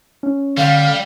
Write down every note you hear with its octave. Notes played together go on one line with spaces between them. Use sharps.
C#4
D3 G3 F5